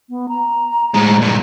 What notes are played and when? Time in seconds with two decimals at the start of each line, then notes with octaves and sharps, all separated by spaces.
0.09 B3
0.29 A#5
0.95 A2 G#3
1.21 G2 A#2